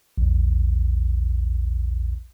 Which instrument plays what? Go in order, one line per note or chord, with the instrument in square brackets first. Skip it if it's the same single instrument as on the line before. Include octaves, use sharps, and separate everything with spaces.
[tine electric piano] A#1 E2